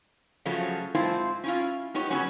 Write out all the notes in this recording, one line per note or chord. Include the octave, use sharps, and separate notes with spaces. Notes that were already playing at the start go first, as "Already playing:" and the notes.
C#3 F3 F#3 A3
G#2 C4 E4 F4 C5 A5
C#4 E4 F4
B3 D#4 G4 C#5
C#3 F#3 B3 C#4 F#4